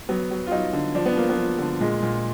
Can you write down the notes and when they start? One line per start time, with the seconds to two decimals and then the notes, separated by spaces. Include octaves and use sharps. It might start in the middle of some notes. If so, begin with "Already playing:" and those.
0.09 F#3 B3
0.31 F#3
0.46 F4
0.51 F#3 D#4
0.73 D3
0.95 F3 D4
1.06 B3
1.16 F3 A#3
1.29 B3
1.37 F3
1.59 D3
1.80 A#2 G#3
2.02 A#2